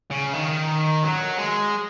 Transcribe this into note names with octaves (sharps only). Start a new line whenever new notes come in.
C#3
D#3
F#3
G#3